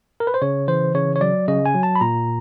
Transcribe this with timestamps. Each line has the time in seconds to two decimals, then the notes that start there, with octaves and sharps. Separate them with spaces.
0.20 A#4
0.27 B4
0.34 C5
0.42 C#3 C#5
0.68 E3 C5
0.95 C#3 C#5
1.16 C#5
1.21 F#3 D5
1.48 C#3 D#5
1.66 G#5
1.74 F#3
1.83 A5
1.95 B5
2.01 A#2 A#5